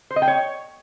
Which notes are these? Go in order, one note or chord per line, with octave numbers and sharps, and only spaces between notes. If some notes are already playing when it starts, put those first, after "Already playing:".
C5
D#5
G5
C#5